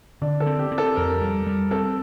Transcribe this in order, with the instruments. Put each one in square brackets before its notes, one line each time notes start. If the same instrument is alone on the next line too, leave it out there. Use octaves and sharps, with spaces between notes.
[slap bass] D3 [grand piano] D4
[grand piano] A4
[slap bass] C4
[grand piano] G4
[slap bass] C4
[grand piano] A4
[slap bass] F2 [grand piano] A#4
[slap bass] G3
G3
[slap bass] C4 [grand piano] A4